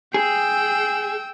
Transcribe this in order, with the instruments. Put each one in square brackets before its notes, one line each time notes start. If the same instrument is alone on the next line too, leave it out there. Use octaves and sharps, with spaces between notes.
[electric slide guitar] G#4 [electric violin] G5 E6